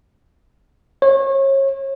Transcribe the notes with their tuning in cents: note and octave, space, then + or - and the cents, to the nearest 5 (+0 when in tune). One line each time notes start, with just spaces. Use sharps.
C#5 -30